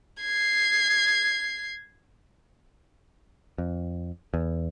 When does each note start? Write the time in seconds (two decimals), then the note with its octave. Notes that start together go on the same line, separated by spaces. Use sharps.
0.20 G#6 C7
3.58 F2
4.34 E2